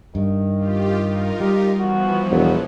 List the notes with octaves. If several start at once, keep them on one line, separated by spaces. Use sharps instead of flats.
G2 D#3
F4 G4
D#4 F4 A#4
G3 G4
E3 F3 B3 F#4
E1 F#3